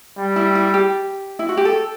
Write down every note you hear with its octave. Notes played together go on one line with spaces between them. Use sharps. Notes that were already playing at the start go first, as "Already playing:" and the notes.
G3
E4
E4
G4
E4
F#4
G4
A4